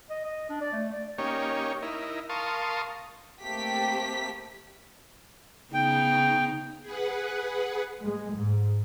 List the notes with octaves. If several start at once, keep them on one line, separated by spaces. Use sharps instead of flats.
D#5
D#5
D4
D5
A3
D5
A#3 C#4 D#4 G4 C#5
D#4 E4 A#4
A#4 F5 A5 C6 C#6 D#6
A3 A#3 C4 G4 B6
C#3 B3 D#4 G5
G#4 B4 F#5
G#3
G#2